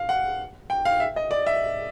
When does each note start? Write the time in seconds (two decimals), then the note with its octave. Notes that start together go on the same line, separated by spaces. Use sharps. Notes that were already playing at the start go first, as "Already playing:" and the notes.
Already playing: F5
0.09 F#5
0.70 G5
0.85 F5
1.00 E5
1.16 D#5
1.31 D5
1.46 E5